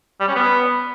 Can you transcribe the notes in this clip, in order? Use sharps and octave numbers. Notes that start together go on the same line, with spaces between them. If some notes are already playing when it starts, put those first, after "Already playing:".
G3
C#4
B3